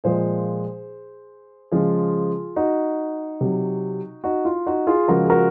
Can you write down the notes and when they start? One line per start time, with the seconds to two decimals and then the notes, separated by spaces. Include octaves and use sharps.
0.04 A#2 F3 G#3 G#4 C5
1.72 C#3 F3 G#3 F4 G#4
2.56 D#4 F#4
3.41 C3 F#3
4.24 D#4 F#4
4.45 F4
4.66 D#4 F#4
4.87 F4 G#4
5.08 C#3 F3 G#3 F#4 A#4
5.24 G#4
5.30 F#4 A#4